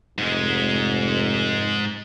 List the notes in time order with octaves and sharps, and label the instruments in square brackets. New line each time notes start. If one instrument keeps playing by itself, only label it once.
[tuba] F1 [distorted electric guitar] G#2 G#3